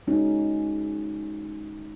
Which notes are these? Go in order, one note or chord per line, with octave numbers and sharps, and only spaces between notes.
G#3 C#4 D#4 F#4